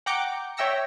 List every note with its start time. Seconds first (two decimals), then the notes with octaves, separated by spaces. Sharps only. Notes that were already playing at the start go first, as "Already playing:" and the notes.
0.06 F#5 G5 A#5 D6 G6 C#7
0.57 C#5 E5 G5 E6 A#6 C#7